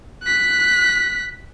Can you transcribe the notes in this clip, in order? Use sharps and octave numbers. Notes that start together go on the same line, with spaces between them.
F#6 B6